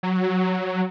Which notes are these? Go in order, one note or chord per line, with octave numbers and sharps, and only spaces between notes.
F#3